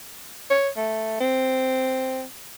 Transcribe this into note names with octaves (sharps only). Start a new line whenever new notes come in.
C#5
A3
C4